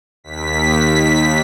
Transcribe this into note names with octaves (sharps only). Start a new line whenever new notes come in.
D#2 B6